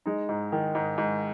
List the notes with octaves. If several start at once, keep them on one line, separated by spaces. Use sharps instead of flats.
G#3 D#4
G#2
D#3
G#2
G#2